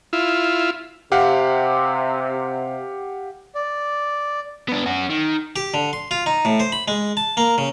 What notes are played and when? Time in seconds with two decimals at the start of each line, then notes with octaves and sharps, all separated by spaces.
0.13 E4 F4
1.12 C3 G4 F5 F#5
3.55 D5
4.68 B3 D4
4.86 C#4 F#4
5.10 D#3
5.56 G4
5.74 D3
5.93 C6
6.11 F4
6.26 D#4
6.45 A2
6.60 C5
6.72 B5
6.88 G#3
7.17 A5
7.37 A#3
7.58 C#3